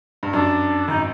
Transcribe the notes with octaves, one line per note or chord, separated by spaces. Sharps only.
G2
F#2 D4
G#1 D#4